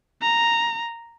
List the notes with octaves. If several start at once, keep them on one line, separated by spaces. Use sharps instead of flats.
A#5